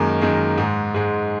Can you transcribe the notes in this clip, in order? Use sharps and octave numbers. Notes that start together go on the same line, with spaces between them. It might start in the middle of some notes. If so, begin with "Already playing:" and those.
Already playing: F#2 D#3 G#3 A#3
F#2 D#3 G#3
G#2 G#3
G#2 G#3